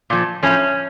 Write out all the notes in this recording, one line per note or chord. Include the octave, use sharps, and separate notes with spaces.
A#2 F3
A2 F3 C#4